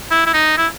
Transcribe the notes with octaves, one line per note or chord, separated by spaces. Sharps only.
E4
E4
D#4
E4